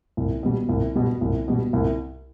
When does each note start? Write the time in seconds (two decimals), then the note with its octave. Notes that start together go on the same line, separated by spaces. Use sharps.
0.17 C2
0.43 B2 G3
0.69 C2
0.95 B2 G3
1.21 C2
1.48 B2 G3
1.73 C2